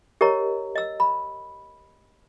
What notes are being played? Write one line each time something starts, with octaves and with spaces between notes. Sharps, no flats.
G4 A#4 C#5 D#5 A#5
D#5 E6
B5